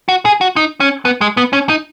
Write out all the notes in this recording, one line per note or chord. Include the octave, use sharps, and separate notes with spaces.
F#4
G#4
F#4
D#4
C#4
B3
G#3
B3
C#4
D#4